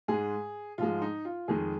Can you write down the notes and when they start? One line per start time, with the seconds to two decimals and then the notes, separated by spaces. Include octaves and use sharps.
0.08 G#2 G#3 G#4
0.78 G#2 F3 G#3 F4
1.02 D#4
1.25 F4
1.48 F2 D#3 G#3 G#4